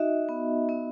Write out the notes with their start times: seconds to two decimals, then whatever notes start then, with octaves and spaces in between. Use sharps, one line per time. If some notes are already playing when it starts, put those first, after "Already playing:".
Already playing: D#4 F#4 D#5 E5
0.29 B3
0.69 B3